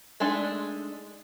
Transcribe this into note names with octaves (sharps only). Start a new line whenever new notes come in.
G#3 A3 D4 D#4